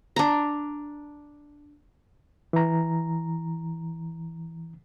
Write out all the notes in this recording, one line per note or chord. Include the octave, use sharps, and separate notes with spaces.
D4 A#5
E3 A#5